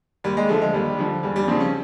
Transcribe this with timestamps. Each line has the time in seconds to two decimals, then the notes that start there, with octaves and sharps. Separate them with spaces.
0.24 D#2 G3
0.37 G#3
0.49 D3 F3 A3
0.62 G#3
0.74 D#2 G3
0.99 D3 F3
1.23 E2 G3
1.36 G3
1.48 C#3 F3 C4
1.60 C#4